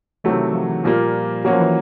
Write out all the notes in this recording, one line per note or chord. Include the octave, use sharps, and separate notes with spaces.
C3 D#3 E3 F#3 A3
F3
E3
A#2 F3 G3 A#3
E3 F#3 A#3 C#4 F#4
F3
E3